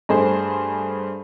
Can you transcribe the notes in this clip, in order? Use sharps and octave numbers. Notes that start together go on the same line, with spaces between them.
G2 A3 G#4 C5